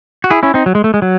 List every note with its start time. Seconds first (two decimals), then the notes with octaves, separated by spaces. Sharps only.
0.24 F#4
0.30 E4 G#4
0.43 C#4 E4
0.54 C4 D#4
0.66 F#3
0.75 G#3
0.84 A3
0.94 G#3
1.02 F#3